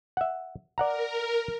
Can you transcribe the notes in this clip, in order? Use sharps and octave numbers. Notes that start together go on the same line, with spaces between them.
E5 F#5
A#4 D5 F#5 A#5